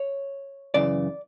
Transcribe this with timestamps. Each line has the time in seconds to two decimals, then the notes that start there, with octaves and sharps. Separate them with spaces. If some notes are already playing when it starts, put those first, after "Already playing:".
Already playing: C#5
0.74 F#2 C#3 E3 D5